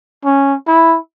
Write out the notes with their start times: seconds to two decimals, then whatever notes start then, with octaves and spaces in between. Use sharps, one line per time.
0.25 C#4
0.68 E4